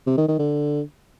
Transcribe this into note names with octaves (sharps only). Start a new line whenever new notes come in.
C3
D#3
D#3
D3